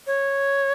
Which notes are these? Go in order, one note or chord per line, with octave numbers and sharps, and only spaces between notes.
C#5